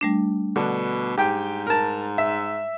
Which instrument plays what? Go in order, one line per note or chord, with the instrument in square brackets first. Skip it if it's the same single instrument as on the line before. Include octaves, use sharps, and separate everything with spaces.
[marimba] G3 A3 D4
[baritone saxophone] B2 [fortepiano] D3
[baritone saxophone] G#2 [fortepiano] G4 G5
[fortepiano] A#4 A5
E5